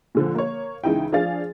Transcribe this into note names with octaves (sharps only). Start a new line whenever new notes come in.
A#2 D3 F3
A#3 A#4 C#5
C#2 C#3 E3 D#4 E4 G5
F3 D4 G#4 F5 A6